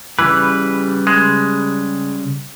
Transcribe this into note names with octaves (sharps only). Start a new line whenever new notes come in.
C#3 E3 G3 B4
G#3